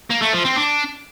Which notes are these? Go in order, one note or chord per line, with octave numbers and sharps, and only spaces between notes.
A#3
A3
F3
C4
D4